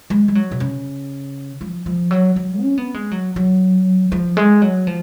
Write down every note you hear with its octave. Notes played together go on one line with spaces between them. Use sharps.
G#3
G#3
F#3
B2
C#3
F3
F3
F#3
F#3
C#4
B3
G#3
F#3
F#3
F3
G#3
F#3
F3